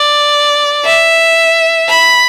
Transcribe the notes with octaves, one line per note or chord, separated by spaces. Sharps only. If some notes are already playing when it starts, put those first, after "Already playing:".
Already playing: D5
E5
B5